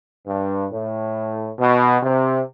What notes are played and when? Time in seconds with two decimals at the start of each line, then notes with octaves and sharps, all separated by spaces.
0.27 G2
0.72 A2
1.59 B2
2.03 C3